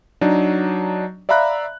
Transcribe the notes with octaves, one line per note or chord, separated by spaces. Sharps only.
F#3 D4 D#4
D5 E5 F5 A#5 B5 F#6